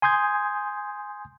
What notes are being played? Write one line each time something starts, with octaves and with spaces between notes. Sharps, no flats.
G#5 C6 D#6 G6 G#6